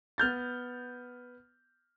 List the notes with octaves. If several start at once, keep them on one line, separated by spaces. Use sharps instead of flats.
B3 F6 G6 A6